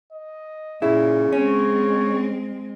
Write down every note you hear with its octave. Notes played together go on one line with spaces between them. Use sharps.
D#5
A#2 C#3 E4
G#3 C4 C#4 C#5